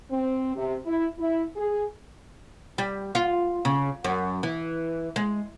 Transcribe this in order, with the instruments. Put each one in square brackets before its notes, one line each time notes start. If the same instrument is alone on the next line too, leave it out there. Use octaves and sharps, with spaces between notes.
[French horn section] C4
C3
E4
E4
G#4
[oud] G3
F4
C#3
F#2
E3
G#3